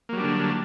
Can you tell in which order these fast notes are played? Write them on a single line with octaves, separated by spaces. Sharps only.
A#3 F#3 G3 D4 D3